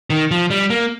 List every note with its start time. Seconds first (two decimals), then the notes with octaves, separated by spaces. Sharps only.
0.10 D#3
0.31 F3
0.50 G3
0.70 A#3